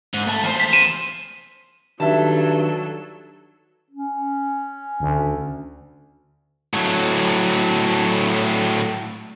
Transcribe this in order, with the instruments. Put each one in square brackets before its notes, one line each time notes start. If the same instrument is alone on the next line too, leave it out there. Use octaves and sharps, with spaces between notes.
[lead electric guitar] G#2
A3 A5
E2 C5
[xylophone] B6
D#7 E7
[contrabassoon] G2 [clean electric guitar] D#3 [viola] F#3 A4 [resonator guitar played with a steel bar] E5 A5
[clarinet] C#4
[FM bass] D2
[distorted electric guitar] A2 F#3